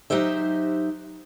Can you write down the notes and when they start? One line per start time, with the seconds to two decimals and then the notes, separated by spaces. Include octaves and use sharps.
0.10 F#3 D#4 G4 C5 E5